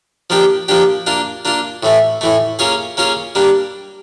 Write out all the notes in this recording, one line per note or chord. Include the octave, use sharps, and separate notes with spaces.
F3 A#3 D4 G4
F3 A#3 D4 G4
A#3 D4 F4
A#3 D4 F4
A2 E3 A3
A2 E3 A3
A#3 C#4 F4 G#4
A#3 C#4 F4 G#4
G3 A#3 D4